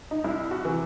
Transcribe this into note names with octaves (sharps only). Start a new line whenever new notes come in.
D#4
C2 E4
F#4
C3 E3